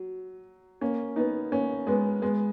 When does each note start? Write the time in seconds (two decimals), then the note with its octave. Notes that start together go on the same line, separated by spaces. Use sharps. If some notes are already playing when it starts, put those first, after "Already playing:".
Already playing: F#3
0.81 A#3 C#4
1.16 B3 D#4
1.52 A#3 C#4
1.87 G#3 B3
2.22 G#3 B3